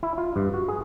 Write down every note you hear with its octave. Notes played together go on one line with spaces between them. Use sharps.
E4
F4
G2
F#4
G#4